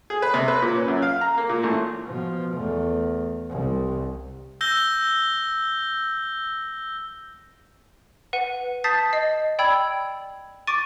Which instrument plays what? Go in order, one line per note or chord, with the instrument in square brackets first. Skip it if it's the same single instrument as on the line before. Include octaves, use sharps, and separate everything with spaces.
[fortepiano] G#4
B4
C3
B4
A#2
C#4
F#2
F5
A#5
A#3
A#2
A1
[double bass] B2 F3
E2 A3
C2
[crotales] E6 G6 A#6 G7
[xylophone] B4 F#5 D#7
A5 D#6 G6 A6 B6 C7
D#5 C7
D5 G5 B5 E6 G#6
C#6 D6 A6 D7 D#7